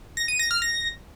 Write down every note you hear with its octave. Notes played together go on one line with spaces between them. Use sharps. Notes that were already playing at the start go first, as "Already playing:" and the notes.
A#6
D#7
A#6
F6
A#6